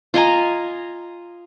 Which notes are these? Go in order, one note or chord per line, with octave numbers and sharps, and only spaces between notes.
F4 D#5 G#5 A#5